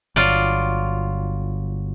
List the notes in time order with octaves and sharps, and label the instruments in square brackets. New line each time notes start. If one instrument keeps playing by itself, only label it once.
[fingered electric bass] G1 [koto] F#3 F4 D5